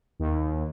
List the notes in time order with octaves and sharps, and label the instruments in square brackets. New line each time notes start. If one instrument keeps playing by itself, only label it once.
[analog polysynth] D#2